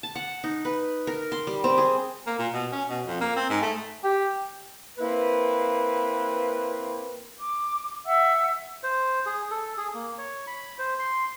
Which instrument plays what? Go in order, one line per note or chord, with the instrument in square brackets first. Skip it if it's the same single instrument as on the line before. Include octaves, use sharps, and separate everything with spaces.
[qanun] A5
F#5
D#4
B4
A#4
C6
G3
C4
G#4
[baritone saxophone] A#3
A#2
B2
C#4
B2
F2
A#3
C4
G#2
A3
[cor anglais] G4
[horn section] A#3 C4 E4 B4
[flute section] D6
E5 F#5 E6
[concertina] C5
G#4
A4
G#4
A#3
C#5
B5
C5
C6